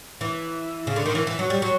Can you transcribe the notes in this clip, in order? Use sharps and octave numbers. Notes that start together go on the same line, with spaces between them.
E3
C#3
D3
D#3
E3
E3
F#3
G3
F#3